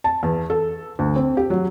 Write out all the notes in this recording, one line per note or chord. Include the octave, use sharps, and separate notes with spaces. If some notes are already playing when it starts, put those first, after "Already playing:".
A5
E2
A4
D2
C4
G4
F#3